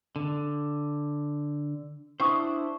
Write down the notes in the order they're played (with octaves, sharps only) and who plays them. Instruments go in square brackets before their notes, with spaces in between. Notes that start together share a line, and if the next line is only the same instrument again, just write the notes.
[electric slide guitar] D3
[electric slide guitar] D4 E4 C5 [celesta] G5 C#6 D#6